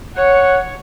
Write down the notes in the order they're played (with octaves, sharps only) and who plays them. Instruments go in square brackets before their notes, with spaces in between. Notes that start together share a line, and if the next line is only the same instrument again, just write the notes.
[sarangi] C#5 [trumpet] F#5